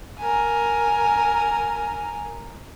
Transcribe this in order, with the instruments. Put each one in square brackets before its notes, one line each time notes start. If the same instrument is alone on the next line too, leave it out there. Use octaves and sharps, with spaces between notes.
[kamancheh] A#4 G#5